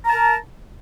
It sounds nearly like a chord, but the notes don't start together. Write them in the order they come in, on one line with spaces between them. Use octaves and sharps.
A#5 A5 A#4